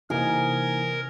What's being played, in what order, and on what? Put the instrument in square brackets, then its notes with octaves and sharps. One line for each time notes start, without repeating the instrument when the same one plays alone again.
[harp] C3 [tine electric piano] E3 A#3 D#4 [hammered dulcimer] G#4 [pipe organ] A#4